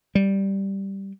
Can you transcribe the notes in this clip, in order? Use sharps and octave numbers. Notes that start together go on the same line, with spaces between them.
G3